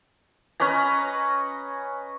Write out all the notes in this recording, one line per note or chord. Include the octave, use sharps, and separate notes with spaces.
C#4 B4 D#5 A#5